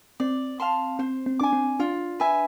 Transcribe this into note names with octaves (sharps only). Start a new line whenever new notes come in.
C4 D5
F5 A5 C6
C4 C5
C4
D4 G#5 D6
C4
D4 F4
B4 E5 G#5